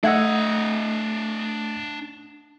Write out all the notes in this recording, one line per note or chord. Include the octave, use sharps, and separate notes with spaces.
A3 D4 D#5 E5 F#5 E6 G#6